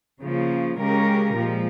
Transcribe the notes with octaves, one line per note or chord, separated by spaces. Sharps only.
C#3 F3 A#3
C#3 G#3 C#4 G4 A#4
A#2 F3 G#3